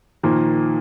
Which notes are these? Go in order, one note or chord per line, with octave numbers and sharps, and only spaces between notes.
A#2 D#3 F3 A#3